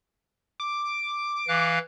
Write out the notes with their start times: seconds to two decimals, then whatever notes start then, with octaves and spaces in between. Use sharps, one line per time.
0.60 D6
1.48 E3 F5 F#6